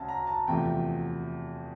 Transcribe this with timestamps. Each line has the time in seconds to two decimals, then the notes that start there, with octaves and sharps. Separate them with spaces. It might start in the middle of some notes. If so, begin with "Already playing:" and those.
Already playing: D2 C#3 A5
0.08 A#5
0.27 A5
0.47 E2 C3 F3 A3 G5